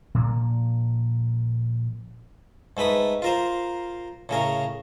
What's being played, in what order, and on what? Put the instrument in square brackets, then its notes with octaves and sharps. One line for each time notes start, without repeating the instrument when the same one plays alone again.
[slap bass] A#2 F3 A#3
[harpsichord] G#2 A3 B4 B5 D#6
F4 A#4 C5
A2 C#3 A#4